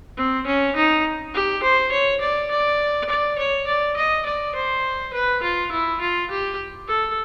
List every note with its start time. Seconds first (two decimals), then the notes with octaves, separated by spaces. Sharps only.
0.17 C4
0.46 C#4
0.76 D#4
1.34 G4
1.63 C5
1.92 C#5
2.21 D5
2.51 D5
3.09 D5
3.38 C#5
3.67 D5
3.97 D#5
4.26 D5
4.55 C5
5.13 B4
5.43 F4
5.72 E4
6.00 F4
6.30 G4
6.88 A4